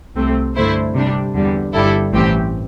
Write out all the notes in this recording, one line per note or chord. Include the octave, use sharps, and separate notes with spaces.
C2 C3 A3 C4
G2 D3 A3 E4 C5
C3 G3 D4
E2 D3 G3
G1 G2 G3 E4 A4
A1 A2 E3 C4 G4